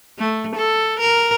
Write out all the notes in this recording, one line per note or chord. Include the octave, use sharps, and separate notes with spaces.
A3
A4
A#4